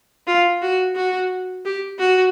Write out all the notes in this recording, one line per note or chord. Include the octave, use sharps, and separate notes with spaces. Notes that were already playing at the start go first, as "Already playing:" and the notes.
F4
F#4
F#4
G4
F#4